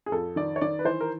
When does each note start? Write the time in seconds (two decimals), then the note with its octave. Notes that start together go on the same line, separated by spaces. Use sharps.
0.06 G#4
0.12 F2 A4
0.36 D#3 D5
0.56 C#5
0.61 D#3 D5
0.79 B4
0.85 E3 C5
1.01 A#4